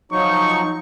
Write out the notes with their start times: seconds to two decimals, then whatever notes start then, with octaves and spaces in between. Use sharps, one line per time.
0.12 F3 F#3 D#4 C#6